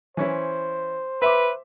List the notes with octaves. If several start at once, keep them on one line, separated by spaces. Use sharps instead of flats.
E3 C#4 E4 C5
B4 E5 C6 D6